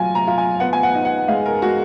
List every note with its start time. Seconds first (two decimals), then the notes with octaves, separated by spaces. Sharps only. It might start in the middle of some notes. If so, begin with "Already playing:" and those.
Already playing: F#3 F4 G#5
0.15 A#5
0.27 F4
0.38 G#5
0.60 B3 F#5
0.73 G#5
0.83 F#5
0.95 D#4
1.05 F#5
1.28 G#3 F5
1.46 A#4
1.62 G#3 F#4